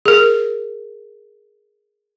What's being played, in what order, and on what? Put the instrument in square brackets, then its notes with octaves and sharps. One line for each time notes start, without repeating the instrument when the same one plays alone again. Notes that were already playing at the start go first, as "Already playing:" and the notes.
[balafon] G#4 A#4